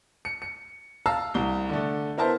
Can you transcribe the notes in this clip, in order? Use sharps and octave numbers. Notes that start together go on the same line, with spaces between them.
C#7
C#7
F5 A5 A#5 E6
C2 G7
D3 A3
B3 E4 A#4 C5 E5 A5